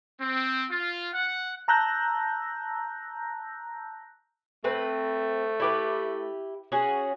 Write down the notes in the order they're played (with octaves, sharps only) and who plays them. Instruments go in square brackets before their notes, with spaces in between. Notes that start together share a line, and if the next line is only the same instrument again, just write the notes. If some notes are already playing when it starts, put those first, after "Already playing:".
[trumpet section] C4
F4
F#5
[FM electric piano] A5 A#5 E6 F#6 G6 A#6
[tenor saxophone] A3 [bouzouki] C4 B4
[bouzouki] E4 G4 B4
C#4 F#4 G#4